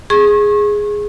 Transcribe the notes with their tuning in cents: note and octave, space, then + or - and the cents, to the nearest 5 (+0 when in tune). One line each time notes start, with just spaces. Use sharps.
G#4 +0 C#6 -35